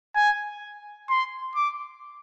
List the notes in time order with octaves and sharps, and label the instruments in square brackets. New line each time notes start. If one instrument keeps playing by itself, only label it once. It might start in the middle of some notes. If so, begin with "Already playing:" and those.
[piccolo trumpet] G#5
C6
D6